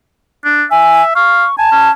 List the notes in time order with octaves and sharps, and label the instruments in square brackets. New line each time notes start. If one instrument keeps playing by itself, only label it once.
[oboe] D4
[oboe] E5 [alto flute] G#5
[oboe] F5 [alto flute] C#6
[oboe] G#5 [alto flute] A5
[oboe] C#4